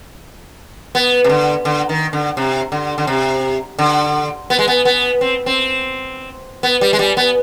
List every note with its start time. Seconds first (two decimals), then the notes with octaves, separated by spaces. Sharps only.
0.95 B3
1.24 C3
1.29 D3
1.65 D3
1.89 D#3
2.13 D3
2.37 C3
2.72 D3
2.98 D3
3.07 C3
3.79 D3
4.50 B3
4.59 G#3
4.68 B3
4.85 B3
5.21 C4
5.46 C4
6.63 B3
6.81 G3
6.93 G#3
6.99 G3
7.17 B3